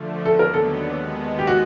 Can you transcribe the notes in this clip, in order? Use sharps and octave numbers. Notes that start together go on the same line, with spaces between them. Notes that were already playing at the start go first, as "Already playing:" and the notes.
Already playing: D3 F3 A3
D#2 D3 F#3 B3 A4
A#4
A4
D#2 D#3 G#3 B3
G4
F#4